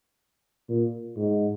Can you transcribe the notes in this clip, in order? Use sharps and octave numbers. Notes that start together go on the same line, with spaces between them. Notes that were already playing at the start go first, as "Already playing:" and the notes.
A#2
G#2